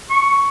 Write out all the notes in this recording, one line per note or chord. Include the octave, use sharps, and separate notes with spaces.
C#6